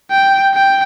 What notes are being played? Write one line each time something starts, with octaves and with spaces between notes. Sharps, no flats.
G5
G5